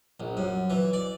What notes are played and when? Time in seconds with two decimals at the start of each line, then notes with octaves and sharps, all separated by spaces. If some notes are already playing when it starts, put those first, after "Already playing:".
0.20 A#1
0.37 F#2
0.70 E3
0.93 D5